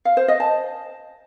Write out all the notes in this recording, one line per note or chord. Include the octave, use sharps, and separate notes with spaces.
F5
C5
D#5
A5